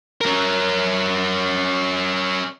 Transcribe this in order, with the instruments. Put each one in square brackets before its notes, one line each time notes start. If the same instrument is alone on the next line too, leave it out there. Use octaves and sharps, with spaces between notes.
[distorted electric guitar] C#4 A#4